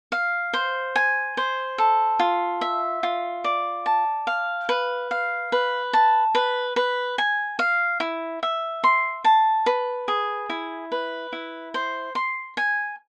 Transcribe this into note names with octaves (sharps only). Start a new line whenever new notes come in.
F5
C5
G#5
C5
A4
F4
E5
F4
D5
A5
F5
B4
F5
B4
A5
B4
B4
G#5
F5
E4
E5
C6
A5
B4
G#4
E4
B4
E4
C5
C6
G#5